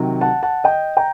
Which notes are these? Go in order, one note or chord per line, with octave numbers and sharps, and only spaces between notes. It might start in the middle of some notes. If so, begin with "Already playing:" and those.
Already playing: C3 D#3 F#3
F#5 A5
F#5 A5
D#5 G5
G5 A#5